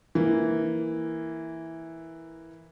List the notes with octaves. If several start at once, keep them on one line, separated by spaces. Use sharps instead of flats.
E3 A#3